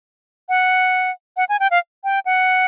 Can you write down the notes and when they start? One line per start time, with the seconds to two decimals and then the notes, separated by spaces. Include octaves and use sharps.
0.49 F#5
1.37 F#5
1.49 G#5
1.60 G5
1.71 F5
2.04 G5
2.26 F#5